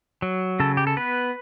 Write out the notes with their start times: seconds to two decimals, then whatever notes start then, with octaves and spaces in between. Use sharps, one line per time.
0.22 F#3
0.60 C#3 A4
0.77 G4
0.87 A4
0.97 B3 B4